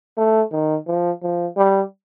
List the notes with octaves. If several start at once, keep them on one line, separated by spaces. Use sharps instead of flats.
A3
D#3
F3
F3
G3